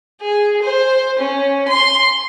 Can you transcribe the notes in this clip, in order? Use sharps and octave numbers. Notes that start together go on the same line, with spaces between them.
G#4
C5
C#4
C6